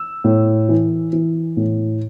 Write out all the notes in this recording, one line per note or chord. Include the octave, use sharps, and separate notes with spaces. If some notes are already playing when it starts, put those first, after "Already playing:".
Already playing: E6
A2
E3
E3
A2